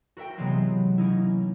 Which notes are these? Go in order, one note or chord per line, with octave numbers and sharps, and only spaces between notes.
F#4 A#4 E5 G5
C3 E3 F#3 G#3 B3 C4
A#3 C#4 D#4 E4